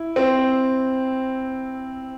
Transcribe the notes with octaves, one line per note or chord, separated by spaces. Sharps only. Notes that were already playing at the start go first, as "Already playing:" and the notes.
Already playing: E4
C4